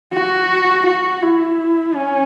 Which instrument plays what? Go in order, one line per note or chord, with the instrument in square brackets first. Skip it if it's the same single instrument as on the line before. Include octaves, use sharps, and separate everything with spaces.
[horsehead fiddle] F#4
F#4
E4
C#4